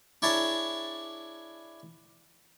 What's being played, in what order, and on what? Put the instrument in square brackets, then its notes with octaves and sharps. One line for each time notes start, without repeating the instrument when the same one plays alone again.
[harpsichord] D4 E4 G#4 C#5 A5 A#5